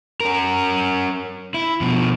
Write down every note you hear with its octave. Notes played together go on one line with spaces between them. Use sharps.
C#4 A#4
E4
B2 F3